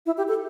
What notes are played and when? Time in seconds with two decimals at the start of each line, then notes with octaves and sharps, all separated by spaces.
0.06 E4
0.18 G4
0.28 A4